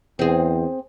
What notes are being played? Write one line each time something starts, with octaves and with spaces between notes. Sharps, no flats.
E2 C4 G#4